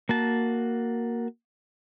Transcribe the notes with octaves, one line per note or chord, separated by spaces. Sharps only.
A#3 F#4 A5